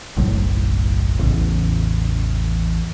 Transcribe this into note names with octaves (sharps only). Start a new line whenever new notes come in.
F#1 B1 A2 F#3
A1 E2 A2 C#3